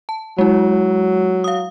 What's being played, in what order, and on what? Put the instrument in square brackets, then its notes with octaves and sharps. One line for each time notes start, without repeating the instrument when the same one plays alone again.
[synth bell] A5
[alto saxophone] F#3 [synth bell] G#3 E4
[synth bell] F5 D#6